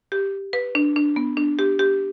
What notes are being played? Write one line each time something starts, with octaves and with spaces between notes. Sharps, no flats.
G4
B4
D4
D4
B3
D4
G4
G4